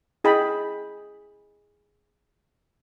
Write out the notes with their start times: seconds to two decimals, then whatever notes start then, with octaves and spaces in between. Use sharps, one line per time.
0.24 E4 G#4 D#5 G5 B5